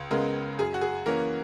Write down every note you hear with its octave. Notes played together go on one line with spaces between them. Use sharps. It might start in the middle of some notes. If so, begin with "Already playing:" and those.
Already playing: C#2
C#3 G#3 B3 A#4
F#2 G#4
F#4
G#4
E3 A#3 C#4 A#4